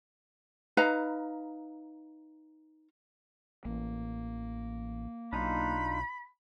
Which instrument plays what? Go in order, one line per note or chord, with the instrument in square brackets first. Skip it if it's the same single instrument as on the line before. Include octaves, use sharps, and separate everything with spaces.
[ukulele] D#4 B4 F5 A#5
[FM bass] A1 [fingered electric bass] A#3
[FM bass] B1 [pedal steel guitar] D4 D#4 F4 [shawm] B5